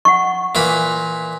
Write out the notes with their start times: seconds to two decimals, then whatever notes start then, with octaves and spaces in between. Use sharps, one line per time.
0.05 F#5 C#6
0.55 A#2 E3 B5